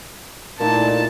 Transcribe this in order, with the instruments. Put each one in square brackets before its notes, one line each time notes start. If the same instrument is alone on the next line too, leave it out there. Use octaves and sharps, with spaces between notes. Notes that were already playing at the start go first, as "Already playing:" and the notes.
[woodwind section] A#2 [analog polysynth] A3 D#4 E4 [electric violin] A5